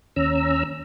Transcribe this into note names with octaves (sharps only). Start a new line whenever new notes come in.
D#2 C#4 A#5 E6